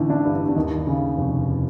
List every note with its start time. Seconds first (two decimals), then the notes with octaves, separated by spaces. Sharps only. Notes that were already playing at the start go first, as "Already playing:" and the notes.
Already playing: A1 D3 D#4
0.10 D4 E4
0.25 G2
0.48 D4
0.56 D#2 D#4
0.87 C#3
1.17 F1